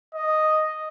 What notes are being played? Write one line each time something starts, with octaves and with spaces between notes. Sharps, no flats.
D#5